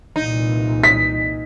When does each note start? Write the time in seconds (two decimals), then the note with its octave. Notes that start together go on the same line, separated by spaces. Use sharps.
0.16 C2 A#2 E3 D#4
0.84 B6